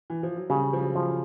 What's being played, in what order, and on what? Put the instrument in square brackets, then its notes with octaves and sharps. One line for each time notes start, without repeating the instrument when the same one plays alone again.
[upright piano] E3
F3
F#3
[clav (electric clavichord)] C#3 [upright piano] G3
[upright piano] F3
F#3
[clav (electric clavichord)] F3